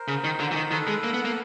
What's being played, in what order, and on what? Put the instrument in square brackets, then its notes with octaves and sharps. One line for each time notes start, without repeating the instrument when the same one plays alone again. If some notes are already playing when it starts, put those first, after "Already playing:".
Already playing: [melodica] A#4 C5
[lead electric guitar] C#3
D#3
D3
E3
D#3
[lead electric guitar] D#3 [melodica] A4 B4
[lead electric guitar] G#3
A#3
B3
A#3